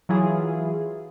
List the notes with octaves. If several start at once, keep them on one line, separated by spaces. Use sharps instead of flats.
E3 F#3 E4 F4 G#4